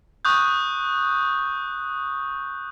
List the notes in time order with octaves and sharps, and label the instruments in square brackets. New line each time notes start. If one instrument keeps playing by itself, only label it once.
[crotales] C#6 D#6 F#6 G6